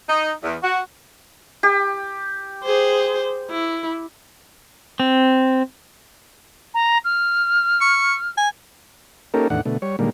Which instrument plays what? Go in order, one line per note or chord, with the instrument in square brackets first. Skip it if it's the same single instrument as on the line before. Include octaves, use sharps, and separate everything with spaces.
[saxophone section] D#4
E2
F#4
[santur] G4
[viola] G#4 C5
E4
[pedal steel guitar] C4
[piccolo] A#5
F6
[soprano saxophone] C#6
G#5
[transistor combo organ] A#3 C#4 D#4 G4 A4 A#4
E2 A2 D#3 D4 F#5
B2 D3 A3
G3 C#5
A#2 D3 D#3 G3 G#3 A#3